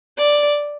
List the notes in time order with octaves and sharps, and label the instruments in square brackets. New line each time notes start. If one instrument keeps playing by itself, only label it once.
[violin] D5